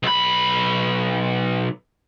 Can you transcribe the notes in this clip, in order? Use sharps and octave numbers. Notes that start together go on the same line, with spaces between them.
B1 B5